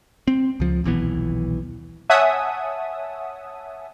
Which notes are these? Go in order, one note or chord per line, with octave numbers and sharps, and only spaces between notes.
C4
C#2 F3
D#1 B1 E3 B3
C#5 E5 F#5 G#5 A5 D#6